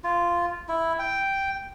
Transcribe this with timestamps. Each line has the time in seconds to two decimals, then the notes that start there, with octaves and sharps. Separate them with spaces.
0.04 F4
0.69 E4
0.99 G5